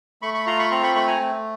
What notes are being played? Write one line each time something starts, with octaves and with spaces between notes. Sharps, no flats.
A3 B5 C#6
B5 C#6
F4 A#5 C6
B5 C#6
C4 A#5 C6
B5 C#6
A3 B5 C#6
G#5 A#5
A3